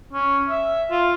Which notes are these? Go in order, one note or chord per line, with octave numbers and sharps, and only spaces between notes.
C#4
E5
F4